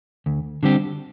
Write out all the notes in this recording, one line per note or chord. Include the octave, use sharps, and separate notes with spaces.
D2
D3 G3 C4 G4